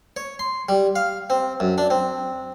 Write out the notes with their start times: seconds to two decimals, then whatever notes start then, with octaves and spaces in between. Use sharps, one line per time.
0.17 C#5
0.39 C6
0.69 G3
0.96 F5
1.30 C4
1.60 F#2
1.78 D4
1.90 C4